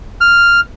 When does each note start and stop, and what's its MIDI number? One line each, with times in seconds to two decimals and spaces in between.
0.21 0.60 89